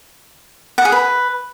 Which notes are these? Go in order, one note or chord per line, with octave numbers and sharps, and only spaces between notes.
F#5
G#4
B4